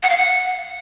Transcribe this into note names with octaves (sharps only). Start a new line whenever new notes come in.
F#5
F5
F#5